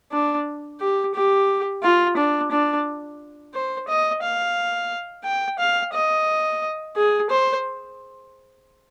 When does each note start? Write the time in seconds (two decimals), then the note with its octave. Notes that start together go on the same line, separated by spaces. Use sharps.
0.12 D4
0.80 G4
1.15 G4
1.83 F4
2.17 D4
2.51 D4
3.54 C5
3.88 D#5
4.22 F5
5.24 G5
5.59 F5
5.93 D#5
6.96 G#4
7.30 C5